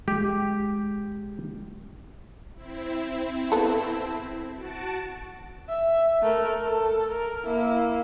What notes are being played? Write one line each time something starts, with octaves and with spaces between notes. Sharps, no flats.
G#3 G4
C4 E4
B3 A4
F#4 A5 D7
E5
A3 A#4
A4
A#4
A#3 E4